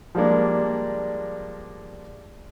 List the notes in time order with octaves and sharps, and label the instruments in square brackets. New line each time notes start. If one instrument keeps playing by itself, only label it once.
[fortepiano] F3 G3 G#3 A#3 D4